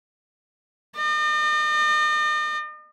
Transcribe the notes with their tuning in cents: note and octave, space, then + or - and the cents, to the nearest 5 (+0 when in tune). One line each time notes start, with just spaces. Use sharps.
D#5 -45